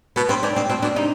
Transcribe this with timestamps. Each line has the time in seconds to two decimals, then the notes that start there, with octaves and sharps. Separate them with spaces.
0.16 B2 B3
0.29 G2 C4
0.43 G#2 D4
0.56 G2 C4
0.69 B2 C4
0.82 B2 D4
0.96 C3 D#4